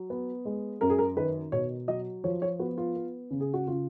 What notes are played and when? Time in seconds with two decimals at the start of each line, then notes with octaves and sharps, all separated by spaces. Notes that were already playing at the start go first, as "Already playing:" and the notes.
Already playing: F#3
0.10 B3
0.45 G#3
0.81 F#2 A#4
0.90 G#4
0.99 A#4
1.17 D#3 B4
1.52 B2 C#5
1.88 F#3 D#5
2.24 F3 C#5
2.42 C#5
2.59 B3 F#4
2.78 F4
2.96 B3
3.31 C#3
3.40 G#4
3.54 F#4
3.67 C#3 F4